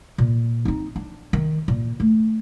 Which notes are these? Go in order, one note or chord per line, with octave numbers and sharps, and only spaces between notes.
A#2
C4 D#4
D4
D#3
A#2
A3